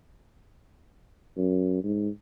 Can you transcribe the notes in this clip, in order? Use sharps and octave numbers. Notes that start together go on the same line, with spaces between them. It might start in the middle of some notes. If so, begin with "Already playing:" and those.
F#2
G#2